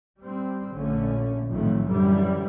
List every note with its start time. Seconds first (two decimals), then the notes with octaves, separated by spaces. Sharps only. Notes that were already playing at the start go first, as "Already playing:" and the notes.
0.20 G3 C4
0.73 A#1 D3 A3 C#4
1.49 B1 F2 A2 D#3 F#3 A3
1.88 F#2 D3 E3 G3